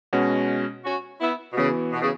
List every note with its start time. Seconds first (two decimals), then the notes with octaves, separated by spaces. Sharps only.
0.13 B2 G#3 C#4 F#4
0.85 C#4 F#4
1.20 B3 E4
1.52 B2
1.57 C#3 E3 B3 F#4
1.93 B2
2.02 C#3